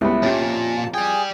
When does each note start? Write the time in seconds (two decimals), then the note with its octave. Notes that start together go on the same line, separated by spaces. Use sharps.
0.01 C#2 G3 B3 E4
0.23 A#2 C#4 G4 A5
0.42 F2
0.94 G#4 D5 G5 G#5